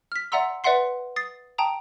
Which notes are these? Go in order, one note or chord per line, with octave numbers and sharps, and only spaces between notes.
F6 B6
D5 E5 F#5 A#5 C6 E6
B4 D5 E5 F#5 C6 C7
D#6 A6 C7
G5 A5 A#5 D#6